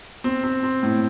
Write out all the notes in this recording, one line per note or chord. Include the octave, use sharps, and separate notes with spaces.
C4
C4
C4
A2